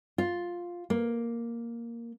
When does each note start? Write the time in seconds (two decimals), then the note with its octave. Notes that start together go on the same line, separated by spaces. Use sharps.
0.18 F4
0.90 A#3